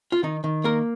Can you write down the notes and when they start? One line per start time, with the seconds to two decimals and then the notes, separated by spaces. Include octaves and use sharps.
0.12 F4
0.23 D#3 D#4
0.44 D#3
0.64 A#3 A#4